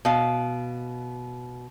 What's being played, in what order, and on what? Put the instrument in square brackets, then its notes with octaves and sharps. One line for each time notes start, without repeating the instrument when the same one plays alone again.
[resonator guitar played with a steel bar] B2 F5